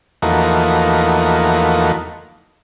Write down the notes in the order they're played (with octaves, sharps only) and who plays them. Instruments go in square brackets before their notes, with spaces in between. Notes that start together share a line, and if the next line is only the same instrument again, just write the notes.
[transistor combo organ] E2 F3 A3 A#3 D#4 F#4